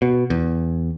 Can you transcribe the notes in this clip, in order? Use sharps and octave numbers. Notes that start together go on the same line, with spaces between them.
B2
E2